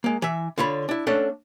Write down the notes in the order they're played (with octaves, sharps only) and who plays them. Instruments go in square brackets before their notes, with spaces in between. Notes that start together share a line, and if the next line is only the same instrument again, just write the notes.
[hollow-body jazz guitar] G#3 A#3
E3 E5
D3 F4 C#5 B5
D4 E4
A3 C#4 D4 A4 F#5